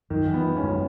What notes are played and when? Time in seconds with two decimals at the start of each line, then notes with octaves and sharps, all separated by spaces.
0.10 F#2 D#3
0.27 E3
0.34 B3
0.45 G#3
0.57 C#4
0.63 F#2